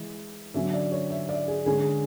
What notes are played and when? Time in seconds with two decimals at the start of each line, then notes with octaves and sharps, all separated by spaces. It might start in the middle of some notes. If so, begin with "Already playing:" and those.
Already playing: E3 G#3
0.54 D3 F#3 C#4 E5
0.73 D5
0.92 C#5
1.10 E5
1.29 D5
1.48 G#4
1.66 D3 G#3 C#4 G#4